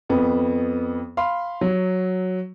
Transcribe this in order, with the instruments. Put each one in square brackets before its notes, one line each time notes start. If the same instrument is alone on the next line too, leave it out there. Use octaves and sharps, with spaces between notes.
[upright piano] F2 B3
F5 B5 C6
F#3